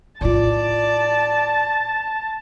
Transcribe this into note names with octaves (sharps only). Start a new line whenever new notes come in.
A2 F4 D5 A5